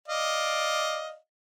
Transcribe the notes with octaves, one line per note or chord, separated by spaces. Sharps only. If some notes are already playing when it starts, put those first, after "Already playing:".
D5 D#5 F5